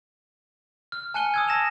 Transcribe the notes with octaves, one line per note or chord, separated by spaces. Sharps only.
F6
G#5 A5 F#6 C#7 D#7 G7
D#6 E6 G#6
A5 A#6 E7 F7